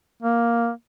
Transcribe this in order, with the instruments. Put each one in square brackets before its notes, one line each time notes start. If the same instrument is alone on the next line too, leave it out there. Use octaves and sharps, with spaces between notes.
[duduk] A#3